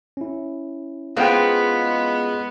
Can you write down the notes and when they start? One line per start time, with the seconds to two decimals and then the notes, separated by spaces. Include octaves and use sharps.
0.17 C#4 E4
1.17 G#3 B3 D#4 F4 B4 C5 G5